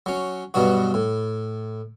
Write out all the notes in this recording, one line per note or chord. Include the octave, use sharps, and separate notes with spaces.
F#3 C#4
G2 B2 F#3 D4 F#4
A2